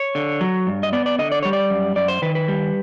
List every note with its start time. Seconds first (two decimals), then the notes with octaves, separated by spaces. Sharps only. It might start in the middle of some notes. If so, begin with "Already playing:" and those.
Already playing: C#5
0.15 D3
0.41 F#3
0.67 G2
0.83 D#5
0.93 B3 D5
1.06 D5
1.19 D3 D#5
1.32 D5
1.43 G3 C#5
1.53 D5
1.70 F#2
1.96 F#2 D5
2.08 C5
2.22 D#3 B4
2.35 B4
2.48 G3